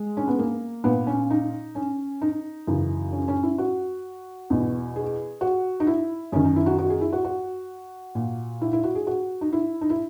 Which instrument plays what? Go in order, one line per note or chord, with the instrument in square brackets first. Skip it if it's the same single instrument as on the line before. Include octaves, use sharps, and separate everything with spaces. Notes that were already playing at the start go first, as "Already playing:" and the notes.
Already playing: [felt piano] G#3
C#4
B3
A#3
A#2 B3
C#4
D#4
C#4
D#4
F#2 C#3 E3
C#4
C#4
E4
F#4
E2 B2
G#4
F#4
D#4
E4
F#2 D#3 C#4
D#4
E4
F#4
F#4
G#4
E4
F#4
F#4
A#2
E4
E4
F#4
G#4
F#4
D#4
E4
D#4
E4